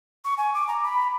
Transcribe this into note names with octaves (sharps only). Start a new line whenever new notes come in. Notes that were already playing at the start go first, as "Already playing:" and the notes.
C#6
G#5
D6
A#5
B5